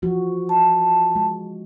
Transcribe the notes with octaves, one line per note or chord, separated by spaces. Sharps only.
E3 F3 F#4
A5
G#3